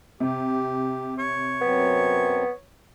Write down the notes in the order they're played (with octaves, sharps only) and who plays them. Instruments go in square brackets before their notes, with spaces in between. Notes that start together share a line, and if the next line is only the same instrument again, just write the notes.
[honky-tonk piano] C3 [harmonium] G4
[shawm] C#5
[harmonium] F#2 F#3 C4 [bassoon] B3